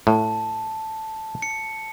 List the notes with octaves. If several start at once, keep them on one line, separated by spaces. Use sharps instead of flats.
A2 A5
C#7